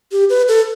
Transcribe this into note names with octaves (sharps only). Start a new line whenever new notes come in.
G4
B4
A4